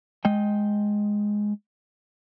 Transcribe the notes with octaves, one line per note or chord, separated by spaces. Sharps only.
G#3 D#5 G5